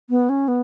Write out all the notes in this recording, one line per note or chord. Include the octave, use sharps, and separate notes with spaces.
B3
C#4
B3